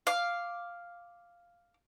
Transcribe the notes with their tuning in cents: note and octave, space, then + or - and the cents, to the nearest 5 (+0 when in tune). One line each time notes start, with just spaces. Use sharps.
F5 +0 D6 +0